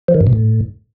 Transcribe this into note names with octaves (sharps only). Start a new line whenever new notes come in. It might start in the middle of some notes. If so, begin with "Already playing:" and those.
F3
D#3
G2
B2
A2